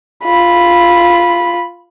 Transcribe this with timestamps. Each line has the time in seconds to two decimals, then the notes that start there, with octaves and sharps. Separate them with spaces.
0.24 F4 B5